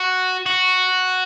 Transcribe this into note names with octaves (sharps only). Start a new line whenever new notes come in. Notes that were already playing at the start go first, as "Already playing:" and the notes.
Already playing: F#4
F#4